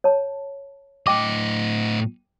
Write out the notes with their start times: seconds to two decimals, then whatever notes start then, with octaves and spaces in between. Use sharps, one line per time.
0.04 C#5 A5
1.07 A2 D#5 G5 D6